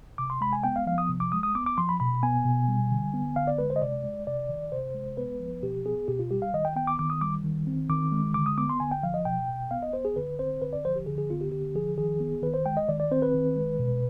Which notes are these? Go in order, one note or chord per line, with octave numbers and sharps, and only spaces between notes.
C3 D6
C6
G#3 B5
G#5
B3 G5
F5
F3 F5
D#6
C3
D6
G#3 D#6
D#6
B3 D6
D6
F3 C6
B5
B2 B5
B3 G#5
B2
G3
D3
B3
D3 F5
D5
G#3 B4
C5
D#5
C3 D5
G#3
C3 D5
D#3
C3 C5
G#3
B3 B4
F3
B2 G4
B3 G#4
B2 G4
F4
G3 G4
F5
D#3 D#5
G5
B3 G5
D6
D#3 D6
D#6
G3 D6
D#3
C4
D#3 D6
G#3
D3 D6
D#6
B3 D6
C6
D3 G#5
G5
F3 F5
D#5
B2 G5
B2
B3 F5
D#5
B3 C5
G#4
D3 B4
C4 C5
D3 B4
D5
F3 C5
G4
D3 G#4
G#4
B3 F4
G4
D3 G4
F3 G#4
D#3 G#4
B3
D#3 B4
C5
G#3 G5
D#5
D#3 D5
D5
C4 C5
B4
D#3
G#3
B2